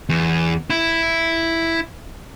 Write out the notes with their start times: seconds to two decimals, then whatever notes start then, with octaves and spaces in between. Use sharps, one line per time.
0.09 E2
0.70 E4